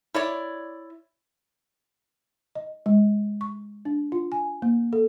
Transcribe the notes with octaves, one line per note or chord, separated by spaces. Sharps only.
E4 C#5 D5
D#5
G#3
C#6
D4
F4
G#5
A#3
A4